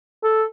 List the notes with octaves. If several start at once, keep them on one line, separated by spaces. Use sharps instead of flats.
A4